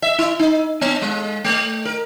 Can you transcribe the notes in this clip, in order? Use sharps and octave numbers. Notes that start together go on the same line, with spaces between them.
E5
E4
D#4
B3
G#3
A3
A#4